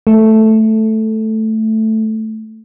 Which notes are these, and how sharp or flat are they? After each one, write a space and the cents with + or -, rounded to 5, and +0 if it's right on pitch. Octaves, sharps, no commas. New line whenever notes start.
A3 +0